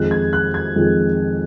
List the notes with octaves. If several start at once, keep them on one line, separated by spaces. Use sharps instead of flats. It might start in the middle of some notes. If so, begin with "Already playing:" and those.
Already playing: F2 D#3 G#3 F#6
G#6
F#6
G#6
F2 D#3 G#3